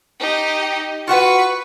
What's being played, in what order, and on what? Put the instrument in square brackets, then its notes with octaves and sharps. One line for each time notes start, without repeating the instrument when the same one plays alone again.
[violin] D#4 G4
[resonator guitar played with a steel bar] F4 F#4 F#5 [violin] B4 C#6